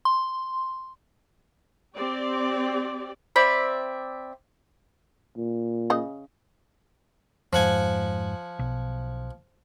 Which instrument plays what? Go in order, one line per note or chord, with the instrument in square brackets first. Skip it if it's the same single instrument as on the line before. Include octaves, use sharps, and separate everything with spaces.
[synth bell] C6
[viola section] C4 G4 D5
[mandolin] C4 D5 E5 B5
[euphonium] A#2
[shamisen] C#3 D#5
[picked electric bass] F2 G#2 [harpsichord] F3 F#5 G#5
[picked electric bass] B1